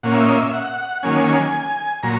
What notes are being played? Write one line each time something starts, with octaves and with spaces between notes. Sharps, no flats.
A#2 A#3 C#4 F#5
E5
D#5
E5
F#5
D#3 F#3 A#3 C#4 G#5
A#2 F#3 A#5